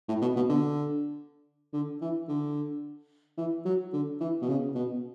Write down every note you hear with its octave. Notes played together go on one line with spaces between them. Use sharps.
A2
B2
B2
D3
D3
E3
D3
E3
F#3
D3
E3
B2
C#3
B2